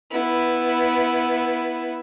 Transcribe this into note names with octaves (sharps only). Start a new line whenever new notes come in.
B3 E4